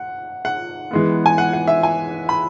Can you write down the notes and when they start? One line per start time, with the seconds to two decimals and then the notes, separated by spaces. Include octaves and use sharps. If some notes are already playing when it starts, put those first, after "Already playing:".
Already playing: F#5
0.45 F#5
0.91 E3 G#3 B3
1.26 G#5
1.38 F#5
1.53 F#5
1.68 E5
1.83 G#5
2.29 B5